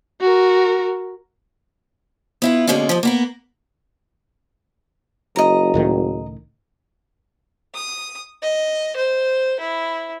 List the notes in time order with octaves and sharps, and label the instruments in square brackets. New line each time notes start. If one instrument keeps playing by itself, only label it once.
[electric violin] F#4 A#4
[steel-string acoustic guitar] B3 E4 F4
B2 D3 G#3 A#3 C#4
D#2 F3
A#3 B3 A#4
[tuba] F#1 [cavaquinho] D#5 A#5
[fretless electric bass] C#2 A2 D#3
[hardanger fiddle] D#6
D#5
C5
E4